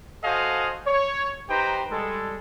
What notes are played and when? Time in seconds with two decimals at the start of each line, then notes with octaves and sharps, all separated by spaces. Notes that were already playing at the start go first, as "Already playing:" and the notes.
0.24 F#4 A4 C5 D#5 F5 G#5
0.87 C#5
1.49 D#4 G4 B4 C5 G5 A#5
1.91 G3 G#3 A4